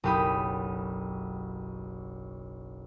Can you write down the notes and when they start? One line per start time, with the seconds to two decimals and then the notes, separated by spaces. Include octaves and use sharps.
0.04 F#1 B1 G4 B5 D#6